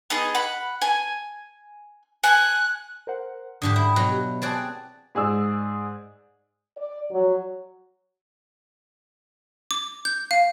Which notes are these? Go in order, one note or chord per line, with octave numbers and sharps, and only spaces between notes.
B3 D#4 G#4
F#5 B5
G#5
G#5 F#6
A#4 C5 F#5
G#2 D3 D4 G4 D#6
E4
B2 F#3
G4
C4 G#4 D5 A5 F#6 A6
G#2 G#4 D5 E6
D5
F#3
D6
G6
F5